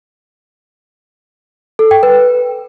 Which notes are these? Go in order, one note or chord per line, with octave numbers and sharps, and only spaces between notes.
A4
G5
B4